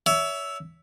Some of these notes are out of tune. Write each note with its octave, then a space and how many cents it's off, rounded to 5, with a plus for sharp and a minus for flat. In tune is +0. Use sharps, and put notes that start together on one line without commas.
C#5 +30 E5 +0